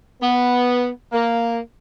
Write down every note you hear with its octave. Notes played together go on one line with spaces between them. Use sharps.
B3
A#3